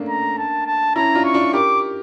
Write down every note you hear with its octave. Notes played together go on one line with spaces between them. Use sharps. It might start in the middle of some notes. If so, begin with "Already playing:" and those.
Already playing: A3 A#3 C#4 D4
A#5
A5
A5
C#4 E4 A#5
D4 F4
C#6
D4 F4
G4 A#4 D6